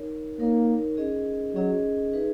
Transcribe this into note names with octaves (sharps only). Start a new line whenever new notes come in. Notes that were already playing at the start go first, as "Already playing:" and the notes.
Already playing: D#4 A#4 C#5
A#3 D#4 A#4 C#5
C#4 G#4 D#5
F#3 C#4 G#4 D#5
D#4 G#4 B4 E5